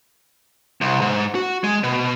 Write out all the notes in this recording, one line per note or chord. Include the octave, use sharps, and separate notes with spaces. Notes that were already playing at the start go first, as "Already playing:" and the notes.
C2
G#2
F#4
G#3
B2